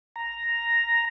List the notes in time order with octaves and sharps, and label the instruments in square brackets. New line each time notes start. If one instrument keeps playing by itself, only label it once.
[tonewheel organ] A#5